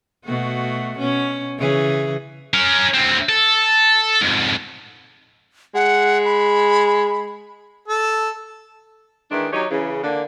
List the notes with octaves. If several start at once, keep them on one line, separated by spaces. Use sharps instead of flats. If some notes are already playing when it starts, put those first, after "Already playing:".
B2 A3 F#4
B2 C#4
C#3 E3 G#4
C#4 A#4
D2 C4
A4
F2 G#2
G#3 F#5
B5
A4
D#3 E3 G#3 D4
F#3 D#4 G4 C#5
C#3 E3
D3 A#3